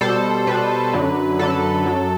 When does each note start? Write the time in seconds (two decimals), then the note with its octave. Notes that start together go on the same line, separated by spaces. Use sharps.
0.01 B2 G3 A4 C5
0.47 B2 G3 B4
0.93 F#2 D3 F#3
1.39 F#2 D3 F#3 A4
1.85 F#2 F#3